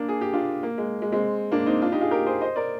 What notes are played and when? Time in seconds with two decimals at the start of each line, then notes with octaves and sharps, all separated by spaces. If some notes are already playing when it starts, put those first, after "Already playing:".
Already playing: A#3 D4
0.09 G#4
0.21 G4
0.33 D4 F4
0.63 A#3
0.78 G#3
1.02 G#3
1.12 G#3 C4
1.52 A#3 D4
1.66 C4 D#4
1.82 D4 F4
1.92 D#4 G4
2.01 F4 G#4
2.11 G4 A#4
2.26 G#4 C5
2.41 C5 D#5
2.56 A#4 D5